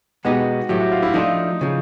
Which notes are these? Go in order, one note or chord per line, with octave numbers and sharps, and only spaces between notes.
B2 G#3 B3 D#4 F#4 G4
A2 F#3 A3 G4
F#4
F4
E4
F3 A3 D4 D#4 F4
C#3 F3